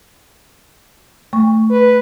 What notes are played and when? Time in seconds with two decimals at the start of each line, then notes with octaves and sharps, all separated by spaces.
1.33 A3 C#6
1.70 B4